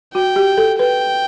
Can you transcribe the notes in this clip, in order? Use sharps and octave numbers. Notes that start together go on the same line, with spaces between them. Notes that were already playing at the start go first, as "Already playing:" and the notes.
F#4 G5
G4
A4
B4 G5